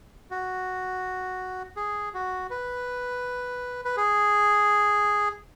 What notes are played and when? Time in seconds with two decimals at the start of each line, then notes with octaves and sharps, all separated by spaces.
0.31 F#4
1.76 G#4
2.14 F#4
2.50 B4
3.85 B4
3.97 G#4